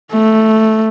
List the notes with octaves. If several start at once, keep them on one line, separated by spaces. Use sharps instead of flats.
A3